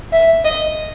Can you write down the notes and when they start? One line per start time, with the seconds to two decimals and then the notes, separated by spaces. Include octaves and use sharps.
0.13 E5
0.45 D#5